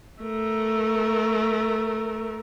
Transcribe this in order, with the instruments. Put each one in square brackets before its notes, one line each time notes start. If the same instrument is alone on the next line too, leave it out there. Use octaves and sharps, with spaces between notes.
[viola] A3 A#4